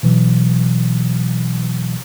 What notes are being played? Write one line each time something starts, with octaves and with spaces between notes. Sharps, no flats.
B2 E3 F#3